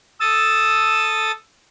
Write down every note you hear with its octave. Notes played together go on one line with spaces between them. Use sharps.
A4 D#6 E6 A6